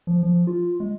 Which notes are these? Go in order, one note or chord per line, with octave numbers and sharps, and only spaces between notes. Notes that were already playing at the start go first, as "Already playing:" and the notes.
F3
F3
F4
G#3